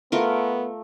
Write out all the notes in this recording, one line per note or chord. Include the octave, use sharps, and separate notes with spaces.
A3 B3 F4 A#4